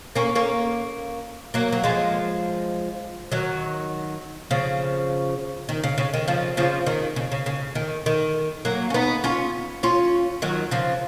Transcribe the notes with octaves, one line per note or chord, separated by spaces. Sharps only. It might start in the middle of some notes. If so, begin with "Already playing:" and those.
A#3 C#4
A#3 C#4
F#3 A#3
F#3
F3 G#3
D#3 F#3
C#3 F3
D#3
C#3
C#3
D#3
C#3 F3
C#3 F3
D#3
C#3
C#3
C#3
D#3
D#3
F#3 A#3
C#4
B3 D#4
C#4 F4
C#4 F4
D#3 F#3
C#3 F3